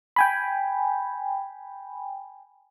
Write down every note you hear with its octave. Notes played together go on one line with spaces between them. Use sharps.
G5 G#5 B5